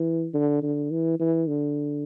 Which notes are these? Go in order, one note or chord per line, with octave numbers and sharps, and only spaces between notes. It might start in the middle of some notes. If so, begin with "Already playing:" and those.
Already playing: E3
D3
D3
E3
E3
D3